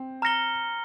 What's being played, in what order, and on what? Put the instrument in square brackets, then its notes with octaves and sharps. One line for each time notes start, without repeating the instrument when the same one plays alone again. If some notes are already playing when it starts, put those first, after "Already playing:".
Already playing: [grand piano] C4
[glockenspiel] A#5 F6 A#6 C#7 G7